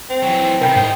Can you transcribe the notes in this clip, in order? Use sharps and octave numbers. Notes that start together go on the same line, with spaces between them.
C4
E3 F#3
C3 D#3 A#4 G5 B5
G#2 C5 D#5 G5